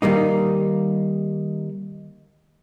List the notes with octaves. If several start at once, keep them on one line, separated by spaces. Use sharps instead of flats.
D#3 G3 A#3 D#4